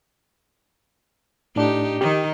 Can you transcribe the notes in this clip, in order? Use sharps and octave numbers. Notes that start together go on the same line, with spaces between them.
A2 D4 D#4 G4
D#3 D#4 G4